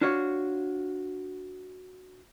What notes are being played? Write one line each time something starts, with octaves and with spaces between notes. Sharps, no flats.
D4 F4 F#4 C#5